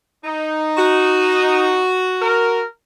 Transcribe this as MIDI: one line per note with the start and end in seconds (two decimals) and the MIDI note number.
0.24 1.85 63
0.77 2.60 66
2.21 2.64 70